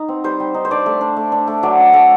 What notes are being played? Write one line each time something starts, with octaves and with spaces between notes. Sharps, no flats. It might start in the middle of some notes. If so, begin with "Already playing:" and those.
Already playing: D#4
C4
G3 C5
G3
D#4
C5
D4 D5
A3
D4
A3
D4
A3
F#3 D5
D4
A3